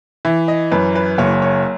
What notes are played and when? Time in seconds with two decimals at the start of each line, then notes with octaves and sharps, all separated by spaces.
0.25 E3 E5
0.48 D#5
0.72 F#2 B4
0.95 B4
1.18 F#1 C#5
1.42 C#5